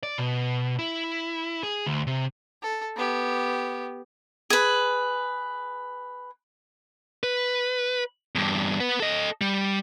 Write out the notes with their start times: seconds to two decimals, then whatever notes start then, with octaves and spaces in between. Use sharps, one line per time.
0.03 D5
0.18 B2
0.79 E4
1.63 G#4
1.86 D2
2.07 C3
2.62 A4
2.96 B3 G4
4.50 G#4 B4
7.23 B4
8.35 E2 G2
8.80 B4 F#5
9.00 A4 D#5
9.41 G3